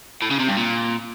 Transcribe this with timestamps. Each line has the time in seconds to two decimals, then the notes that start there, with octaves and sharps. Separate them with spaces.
0.22 A2
0.31 C#3
0.39 C3
0.48 G2
0.57 A#2